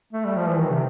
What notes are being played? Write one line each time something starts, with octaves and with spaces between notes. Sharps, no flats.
A3
G3
F3
E3
D#3
C3